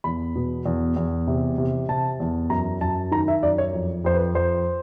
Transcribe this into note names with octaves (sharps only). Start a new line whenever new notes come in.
E2 B5
B2
E2
E2
C3
C3
C3 A5
E2
F#2 A#5
F#2 A5
D#3 A#5
E5
F#2 D5
C#5
F2
F2 C5
B4
F2 C5